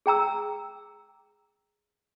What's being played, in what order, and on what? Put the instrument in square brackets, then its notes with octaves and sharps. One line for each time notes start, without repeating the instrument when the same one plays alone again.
[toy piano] G#4 G5 A#5 E6